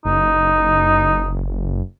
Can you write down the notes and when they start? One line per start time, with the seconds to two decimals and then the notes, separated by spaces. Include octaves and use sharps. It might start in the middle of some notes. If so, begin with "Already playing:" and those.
0.05 F#1 D#4